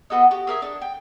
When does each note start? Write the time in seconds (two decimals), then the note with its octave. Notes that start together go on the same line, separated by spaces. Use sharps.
0.10 B3 F#4 A4 D#5
0.31 F#4 G4
0.47 G#4 A#4 E5 G#5
0.62 D4 A4
0.82 G5